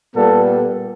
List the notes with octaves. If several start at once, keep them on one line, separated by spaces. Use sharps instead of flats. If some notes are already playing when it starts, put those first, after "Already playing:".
A#2 G3 B3 A4